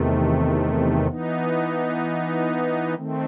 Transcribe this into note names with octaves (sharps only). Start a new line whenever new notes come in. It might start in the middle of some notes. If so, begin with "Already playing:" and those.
Already playing: E2 C3 D#3 A3
E3 B3 D#4
D#3 A3 C4